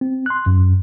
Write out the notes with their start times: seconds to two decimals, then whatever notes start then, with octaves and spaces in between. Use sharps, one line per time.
0.01 C4
0.26 C6 F#6
0.46 F#2